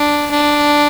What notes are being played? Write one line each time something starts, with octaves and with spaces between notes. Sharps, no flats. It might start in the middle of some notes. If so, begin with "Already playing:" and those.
Already playing: D4
D4